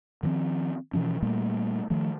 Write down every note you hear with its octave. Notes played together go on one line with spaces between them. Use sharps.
D#3 F3 G#3 C4
B2 E3 F3 C#4
A#2 G3 A3 A#3
D#3 F3 A3